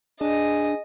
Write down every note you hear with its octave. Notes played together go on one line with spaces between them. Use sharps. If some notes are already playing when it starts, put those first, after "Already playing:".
D4 G#4 D#5